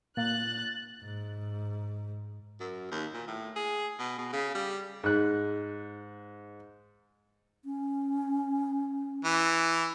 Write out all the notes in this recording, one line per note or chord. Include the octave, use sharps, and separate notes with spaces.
A#2 F#6 A6
G#2
F#2
D#2
A#2
A2
G#4
B2
B2
C#3
G3
G#2 F#6
C#4
E3